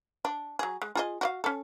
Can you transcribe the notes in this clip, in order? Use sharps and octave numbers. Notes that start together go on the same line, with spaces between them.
D4
F#3 G#4
G#3
F4 G#4 D#5
F#4 D5 F5
C#4 A4